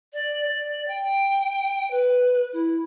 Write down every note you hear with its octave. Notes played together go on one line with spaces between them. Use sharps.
D5
D5
G5
B4
E4